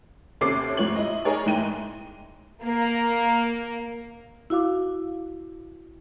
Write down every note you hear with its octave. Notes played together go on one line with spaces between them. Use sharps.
D#2 C3 C#4 A4 D6 C7
G#2 F3 C#5 F#7
E4 D#5
D#4 G#4 A#4 C#5 D5 A5
G#2 E3 D#4 G5 D#7
A#3
E4 F#4 F5 D6